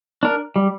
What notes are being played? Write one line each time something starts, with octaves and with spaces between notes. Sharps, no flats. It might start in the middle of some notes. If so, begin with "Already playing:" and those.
D4 A#4
G3